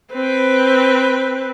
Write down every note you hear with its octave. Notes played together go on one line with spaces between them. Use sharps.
C4 B4